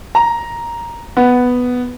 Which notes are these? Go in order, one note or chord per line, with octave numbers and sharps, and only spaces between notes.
A#5
B3